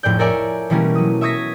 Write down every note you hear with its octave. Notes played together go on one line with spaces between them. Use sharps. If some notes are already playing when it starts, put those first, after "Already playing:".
F1 A2 G#4 D5 G6
A4 A#4 C#5 D5 E5 G#5
B2 E3 G3 A3 A#3 C#4
F#3 D#6
E5 C#6 D#6 G#6 A#6 B6